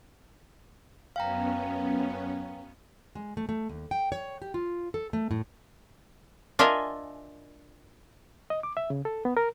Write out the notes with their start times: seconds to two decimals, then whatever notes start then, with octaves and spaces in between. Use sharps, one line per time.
1.16 F#2 B3 C#4 F5 G5 A#5
3.15 G#3
3.37 A3
3.49 A3
3.69 D#2
3.91 G5
4.12 C#5
4.42 G4
4.54 F4
4.94 A4
5.13 A3
5.31 A2
6.59 D4 F4 A#4 D#5 E5 G#5
8.50 D#5
8.63 D6
8.77 E5
8.90 C#3
9.05 A4
9.25 B3
9.37 A#4